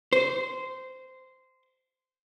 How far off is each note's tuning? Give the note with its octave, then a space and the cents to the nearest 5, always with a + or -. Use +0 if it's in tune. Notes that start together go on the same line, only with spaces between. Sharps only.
C5 -15